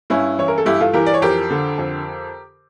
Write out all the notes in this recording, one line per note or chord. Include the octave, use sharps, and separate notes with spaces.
G2 C#4 E4
E3 C#5
A#4
A4
G2 E4 G4
F4 A4
E3 G4 A#4
D5
C#5
F2 G4 A#4
D3
F2